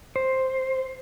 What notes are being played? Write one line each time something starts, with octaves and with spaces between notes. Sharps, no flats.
C5